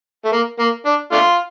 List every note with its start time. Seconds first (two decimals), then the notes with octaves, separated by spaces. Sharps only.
0.25 A3
0.32 A#3
0.59 A#3
0.86 D4
1.12 A3 D4 F4